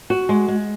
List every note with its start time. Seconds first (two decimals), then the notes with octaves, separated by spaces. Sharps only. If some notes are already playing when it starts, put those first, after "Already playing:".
0.10 F#4
0.29 G#3
0.48 G#3